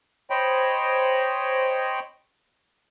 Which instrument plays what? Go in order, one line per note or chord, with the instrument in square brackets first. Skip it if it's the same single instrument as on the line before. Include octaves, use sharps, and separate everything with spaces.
[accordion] C5 C#5 D#5 G5 B5